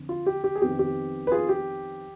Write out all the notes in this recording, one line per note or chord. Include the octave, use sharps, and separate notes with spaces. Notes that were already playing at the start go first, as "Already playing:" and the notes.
Already playing: F2 D3
F4
G4
G4
G#4
F2 D#3 B3 G4
G4
B4
F4 G#4
G4